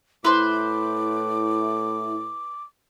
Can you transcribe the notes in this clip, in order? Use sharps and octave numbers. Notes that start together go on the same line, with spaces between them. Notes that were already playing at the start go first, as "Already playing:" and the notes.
A2 E4 B4 C5 D6